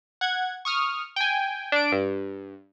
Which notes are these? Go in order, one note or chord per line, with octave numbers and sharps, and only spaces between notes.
F#5 G#6
C#6 D#6 F6
G5 G#5
D4 D7
G2